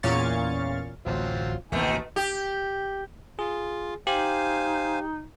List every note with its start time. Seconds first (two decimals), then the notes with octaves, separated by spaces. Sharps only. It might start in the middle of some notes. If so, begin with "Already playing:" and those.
0.03 E2 A#2 C#4 F5 C#6 A6
1.06 D1 A1 F#3 C4 F4
1.72 A1 D2 B2 D#3 A3 A#3 E4 G#5
2.16 G4
3.39 F4 G#4
4.07 D#4 G4 C5 F5 G#5